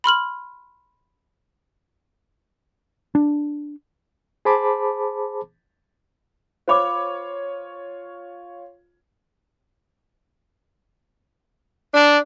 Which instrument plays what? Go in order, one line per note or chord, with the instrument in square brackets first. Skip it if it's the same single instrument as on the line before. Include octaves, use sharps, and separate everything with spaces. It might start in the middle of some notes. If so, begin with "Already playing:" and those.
[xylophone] B5 C6 F6 F#7
[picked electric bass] D4
[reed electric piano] G#4 C5 A5 B5 D6
[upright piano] F4 C#5 [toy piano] C5 B5 D6
[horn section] D4